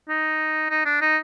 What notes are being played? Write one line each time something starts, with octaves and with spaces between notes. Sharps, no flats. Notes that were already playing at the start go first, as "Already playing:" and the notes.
D#4
D#4
D4
D#4